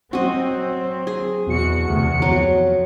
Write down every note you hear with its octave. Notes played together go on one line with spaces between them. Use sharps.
F#3 C4 F#4 D#5
G#4
E2 B2 F#4 C#7
D2 C3
F2 F#3